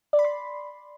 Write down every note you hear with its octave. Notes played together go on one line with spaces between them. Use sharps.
D5
B5
C6